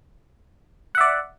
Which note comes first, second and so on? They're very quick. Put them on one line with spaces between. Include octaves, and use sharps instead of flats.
F#5 E5 D5